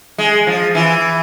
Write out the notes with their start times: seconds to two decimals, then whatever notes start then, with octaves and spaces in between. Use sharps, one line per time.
0.18 G#3
0.47 F3
0.75 E3